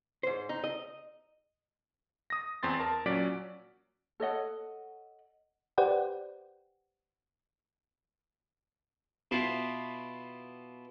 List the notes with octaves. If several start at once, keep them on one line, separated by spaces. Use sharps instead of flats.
G#2 C5
D#4
D#5
D#6 A#6
E2 C4 C6 A6
A#4 A5
A#2 F#3 C#4 D5 B6 D7
A4 C#5 D#5 F#5
G4 B4 C5 D5 F#5 G5
B2 E4 F4